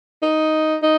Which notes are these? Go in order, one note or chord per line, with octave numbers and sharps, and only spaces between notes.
D#4
D#4